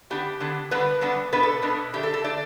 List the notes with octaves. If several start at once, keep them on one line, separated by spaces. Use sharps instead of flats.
D3 B3 D4 G4
D3 B3 D4
D3 G3 B3 D4 B4
D3 G3 B3 D4
B2 B3 D4 B4
A4
B2 B3 D4
D3 A3 D4 G4
A4
A4
D3 A3 D4 D5